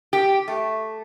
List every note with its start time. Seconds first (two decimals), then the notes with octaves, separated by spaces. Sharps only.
0.13 G4
0.48 A3